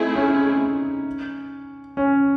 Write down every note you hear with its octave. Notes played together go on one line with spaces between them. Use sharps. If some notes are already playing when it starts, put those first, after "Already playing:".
Already playing: A3 C4 D#4 E4 G#4
C#4
C#4